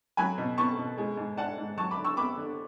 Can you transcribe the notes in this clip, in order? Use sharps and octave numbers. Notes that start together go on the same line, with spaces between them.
F#3 G#5 B5
B2
B3 A5 C#6
B2
G#3
G#2
D4 F#5 A5
G#2
F#3 A5 C#6
B5 D6
D3
C#6 E6
B3 B5 D6
D3